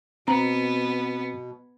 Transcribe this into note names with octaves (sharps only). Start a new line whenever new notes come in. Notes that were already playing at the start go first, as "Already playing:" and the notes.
B2 B3 C4 A#5